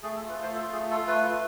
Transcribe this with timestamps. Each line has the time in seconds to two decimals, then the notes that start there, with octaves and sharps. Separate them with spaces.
0.03 A3 G#4
0.16 A4
0.20 F4
0.29 B4
0.37 A3
0.42 C5
0.55 F4 A4
0.72 A3 G#4
0.90 F4 A4
1.07 A3 B4
1.24 F4